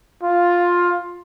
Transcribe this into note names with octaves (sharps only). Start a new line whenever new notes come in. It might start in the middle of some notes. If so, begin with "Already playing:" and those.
F4